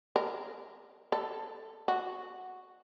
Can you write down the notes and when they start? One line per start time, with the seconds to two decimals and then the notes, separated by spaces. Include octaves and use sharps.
0.16 A#4
1.12 A4
1.88 F#4